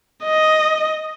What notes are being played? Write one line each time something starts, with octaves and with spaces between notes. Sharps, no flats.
D#5